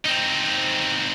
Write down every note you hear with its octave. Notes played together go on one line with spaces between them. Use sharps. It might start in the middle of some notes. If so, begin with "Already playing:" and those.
C4 D#4